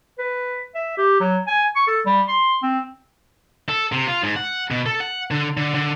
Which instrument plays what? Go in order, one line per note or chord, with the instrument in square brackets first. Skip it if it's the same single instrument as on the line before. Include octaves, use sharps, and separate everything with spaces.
[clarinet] B4
E5
G4
F#3
G#5
C#6
A4
G3
C6
C4
[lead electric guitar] A4
C3
F4
G#2
F#5
B2
A4
F#5
D3
D3
D3